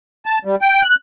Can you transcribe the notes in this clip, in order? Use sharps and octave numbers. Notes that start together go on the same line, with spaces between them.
A5
G3
G5
F#6